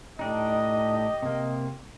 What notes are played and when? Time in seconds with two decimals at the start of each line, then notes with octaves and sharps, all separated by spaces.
0.19 A2 D4 D#4 G4 D#5
1.22 C3 A#3